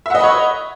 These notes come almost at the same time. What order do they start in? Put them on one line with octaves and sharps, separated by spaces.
E5 F#5 D#5 B5 C#5